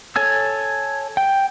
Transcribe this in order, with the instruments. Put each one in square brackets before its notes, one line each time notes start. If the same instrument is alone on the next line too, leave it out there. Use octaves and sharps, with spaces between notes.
[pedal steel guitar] A4 C#5 G#5 E6
G5